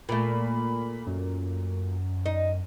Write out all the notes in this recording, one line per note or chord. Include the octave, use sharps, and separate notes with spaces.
A#2 A3 B5
F#2
D#4